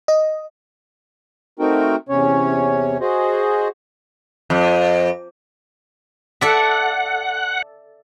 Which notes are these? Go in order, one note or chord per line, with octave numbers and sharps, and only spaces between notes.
D#5
A3 C4 D#4 F#4 A#4 G5
E2 C3 C#4 C#5
F#4 G#4 C5 D#5
F2
A4 D5 E5 F#5